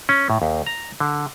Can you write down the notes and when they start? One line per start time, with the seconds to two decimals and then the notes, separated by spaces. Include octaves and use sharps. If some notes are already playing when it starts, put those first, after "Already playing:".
0.09 C#4
0.30 A2
0.42 D#2
0.66 A#5
1.00 D3